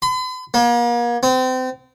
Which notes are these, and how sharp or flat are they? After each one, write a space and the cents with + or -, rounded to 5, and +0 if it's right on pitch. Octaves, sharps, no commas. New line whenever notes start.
B5 +45
A#3 +40
C4 -30